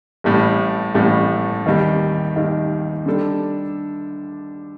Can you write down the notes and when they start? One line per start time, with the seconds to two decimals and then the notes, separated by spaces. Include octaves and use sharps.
0.24 A1 A2 G3
0.95 A1 A2 G3
1.66 D#2 D#3 G3
2.36 D#2 D#3 G3
3.06 D3 G3 D4 A4